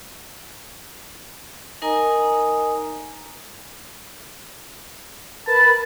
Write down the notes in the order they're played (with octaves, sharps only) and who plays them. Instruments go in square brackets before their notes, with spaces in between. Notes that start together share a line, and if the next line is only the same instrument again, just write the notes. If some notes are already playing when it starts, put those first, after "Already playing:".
[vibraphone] D#4 A#4 D#5 G#5 A#5 D#6
[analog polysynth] A#4 B4 B5 [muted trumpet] A5